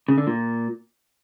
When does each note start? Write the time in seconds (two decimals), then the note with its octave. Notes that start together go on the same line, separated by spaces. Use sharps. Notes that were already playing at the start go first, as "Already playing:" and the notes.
0.08 C#3
0.18 D3
0.27 A#2